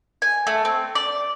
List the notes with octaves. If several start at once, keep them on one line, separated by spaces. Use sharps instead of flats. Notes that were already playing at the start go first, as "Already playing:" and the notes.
G#5
A3
C4
D5